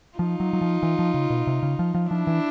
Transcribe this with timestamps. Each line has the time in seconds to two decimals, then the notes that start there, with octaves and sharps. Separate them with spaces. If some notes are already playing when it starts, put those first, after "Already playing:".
0.18 F3 D#4 F4
0.40 F#3
0.53 F#3
0.61 F3
0.83 E3
0.99 F3
1.14 C#3
1.30 B2
1.47 C3
1.63 C#3
1.79 F3
1.95 F3
2.10 F3 D4 E4
2.27 E3